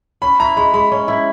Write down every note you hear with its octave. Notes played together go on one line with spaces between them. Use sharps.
C#4 B5
E4 A#5
G#3 B5
G#3 B5
C#4
E4